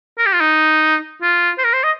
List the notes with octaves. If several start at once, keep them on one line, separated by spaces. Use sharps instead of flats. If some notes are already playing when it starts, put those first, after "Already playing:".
A#4
G4
F4
D#4
F4
C5
A#4
C5
D#5